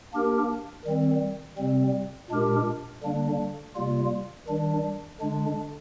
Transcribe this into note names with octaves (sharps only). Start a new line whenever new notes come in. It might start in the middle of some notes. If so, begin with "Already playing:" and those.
A#3 D4 G4 A#4
D#3 G3 C4
C3 G3 C4
A#2 G#3 D4 G4 A#4
D3 G3 A#3 D4
C3 G3 A#3 F4
D#3 G3 D4
D3 G#3 D4